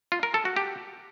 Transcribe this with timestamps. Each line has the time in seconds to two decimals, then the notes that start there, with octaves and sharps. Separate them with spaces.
0.12 F4
0.23 A#4
0.34 A4
0.45 F#4
0.56 G4